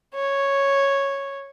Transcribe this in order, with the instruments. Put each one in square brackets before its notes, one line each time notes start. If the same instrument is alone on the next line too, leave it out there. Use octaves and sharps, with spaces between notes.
[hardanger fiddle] C#5